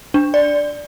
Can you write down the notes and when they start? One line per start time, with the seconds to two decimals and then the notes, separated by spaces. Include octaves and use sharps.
0.14 D4
0.34 D5